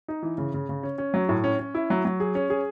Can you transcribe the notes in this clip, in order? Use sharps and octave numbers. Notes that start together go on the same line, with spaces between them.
D#4
E3
C#3
C#3
C#3
C#4
C#4
F#3
A2
C#4
C#4
E4
F#3
F#3
G#4
C#4
G#4